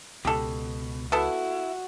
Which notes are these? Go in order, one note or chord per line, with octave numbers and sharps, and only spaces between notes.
C#2 B2 G4 A4
B3 E4 F#4 A4